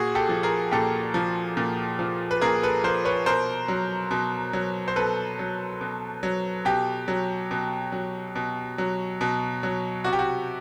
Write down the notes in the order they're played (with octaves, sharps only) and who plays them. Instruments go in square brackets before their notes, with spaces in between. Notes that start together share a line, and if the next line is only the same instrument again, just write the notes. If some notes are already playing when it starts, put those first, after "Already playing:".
Already playing: [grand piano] A#2 F#4 G#4
G4 A4
F3
G#4 A#4
A#2 G4 A4
F3
A#2
F3
B4
A#2 G#4 A#4
A4 B4
F3 A#4 C5
B4 C#5
B2 A#4 C5
F#3
B2
F#3
C5
B2 A4 B4
F#3
B2
F#3
B2 G4
F#3
B2
F#3
B2
F#3
B2
F#3
C3 F#4
G4
F#4